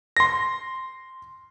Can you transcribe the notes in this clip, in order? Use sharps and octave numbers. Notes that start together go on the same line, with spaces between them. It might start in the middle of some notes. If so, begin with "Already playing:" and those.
C6 A#6